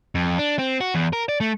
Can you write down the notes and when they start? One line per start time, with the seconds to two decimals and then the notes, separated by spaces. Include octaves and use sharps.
0.15 F2
0.38 D4
0.59 C4
0.81 F#4
0.95 E2
1.13 A#4
1.29 D5
1.40 A3